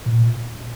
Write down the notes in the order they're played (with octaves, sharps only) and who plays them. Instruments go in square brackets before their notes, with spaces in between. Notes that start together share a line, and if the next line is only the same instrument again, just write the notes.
[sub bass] A#2